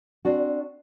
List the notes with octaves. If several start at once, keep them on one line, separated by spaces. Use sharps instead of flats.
C4 D4 F#4